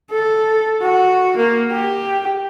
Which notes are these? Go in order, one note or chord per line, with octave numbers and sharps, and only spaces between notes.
A4
F#4
A#3
G4